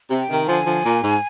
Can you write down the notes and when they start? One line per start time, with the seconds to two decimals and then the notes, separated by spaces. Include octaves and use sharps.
0.10 C3
0.19 G5
0.29 C3 D#3
0.47 D3 F3 G#5
0.65 D3 F3
0.84 A#2
1.02 G#2